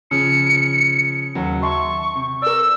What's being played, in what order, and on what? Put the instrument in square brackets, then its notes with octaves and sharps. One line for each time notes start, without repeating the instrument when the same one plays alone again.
[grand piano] C#3 F3 [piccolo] C#7
[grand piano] D#2 C#3 F#3
[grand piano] E5 A5 C6 [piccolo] C#6
[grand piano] C3
[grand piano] A#4 D5 [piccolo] E6